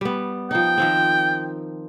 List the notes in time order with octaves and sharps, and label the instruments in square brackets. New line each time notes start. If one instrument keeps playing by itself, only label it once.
[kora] G3 B3
[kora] F3 D#4 [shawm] G5
[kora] D#3 F3 C4